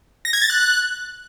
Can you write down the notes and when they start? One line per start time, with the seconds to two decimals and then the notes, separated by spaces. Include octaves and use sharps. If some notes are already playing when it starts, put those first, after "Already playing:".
0.25 A#6
0.33 G#6
0.41 A6
0.50 F#6